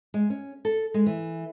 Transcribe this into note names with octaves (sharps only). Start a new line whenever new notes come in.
G#3
C#4
A4
G#3
E3